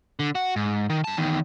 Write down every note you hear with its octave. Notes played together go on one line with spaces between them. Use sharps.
D3
F#4
G#2
D#3
G2 A5
E2 D#3